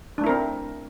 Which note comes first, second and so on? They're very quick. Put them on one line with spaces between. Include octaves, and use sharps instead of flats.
D4 A3 E4 A#4 C4